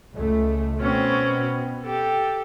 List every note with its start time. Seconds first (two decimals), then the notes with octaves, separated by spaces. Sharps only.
0.15 C#2 A3
0.81 B2 C4 C#4
1.83 G4 A4